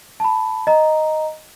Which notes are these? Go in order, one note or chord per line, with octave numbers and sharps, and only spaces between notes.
A5 B5
D#5 A#5